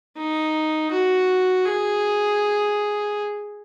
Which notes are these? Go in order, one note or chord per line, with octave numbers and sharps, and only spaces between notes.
D#4
F#4
G#4